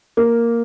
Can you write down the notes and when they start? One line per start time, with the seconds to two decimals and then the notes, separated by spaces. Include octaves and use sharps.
0.17 A#3